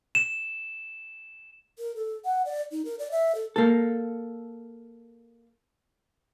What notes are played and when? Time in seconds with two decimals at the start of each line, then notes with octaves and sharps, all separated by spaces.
0.15 E7
1.79 A#4
1.96 A4
2.25 F#5
2.45 D5
2.72 D#4
2.85 A#4
2.99 D5
3.11 E5
3.35 A4
3.56 A#3 A4